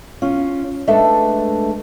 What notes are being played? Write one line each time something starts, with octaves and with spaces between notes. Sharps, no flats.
C#4 F4
G#3 A3 D4 A4 B4 E5